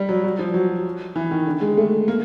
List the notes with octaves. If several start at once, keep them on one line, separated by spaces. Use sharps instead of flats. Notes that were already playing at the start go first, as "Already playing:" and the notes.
Already playing: G3
F#3
F#3
F3
F#3
E3
D#3
D3
G#3
A3
A#3